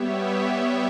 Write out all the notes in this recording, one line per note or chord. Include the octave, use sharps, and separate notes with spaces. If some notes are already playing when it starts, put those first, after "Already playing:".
Already playing: G3 B3 G4 C#5 E5